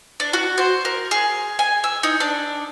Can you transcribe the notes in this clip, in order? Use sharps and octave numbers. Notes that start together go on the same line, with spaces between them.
D4
F#4
C5
A#4
G#4
G#5
E6
D#4
D4